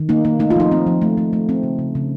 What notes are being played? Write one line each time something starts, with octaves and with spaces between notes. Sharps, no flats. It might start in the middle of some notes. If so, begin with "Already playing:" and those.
Already playing: D#3
A#3 D#4
A#3
A3 D#4
F4
F3 D#4
C4
F3
A3
A3
A3
C4
C#3
C#3
C#3